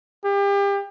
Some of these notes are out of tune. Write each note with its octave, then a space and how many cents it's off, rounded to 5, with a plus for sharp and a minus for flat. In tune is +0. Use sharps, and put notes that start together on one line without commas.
G4 +35